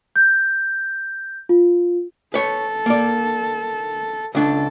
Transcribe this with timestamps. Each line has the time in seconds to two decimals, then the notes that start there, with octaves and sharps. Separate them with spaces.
0.16 G6
1.49 F4
2.34 A4 B4 C#5
2.86 A#3 D5
4.35 C#2 D4 A4